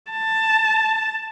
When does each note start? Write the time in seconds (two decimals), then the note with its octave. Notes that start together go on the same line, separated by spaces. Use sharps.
0.11 A5